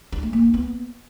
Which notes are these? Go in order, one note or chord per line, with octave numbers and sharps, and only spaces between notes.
D4
A3
A#3
D#4
B3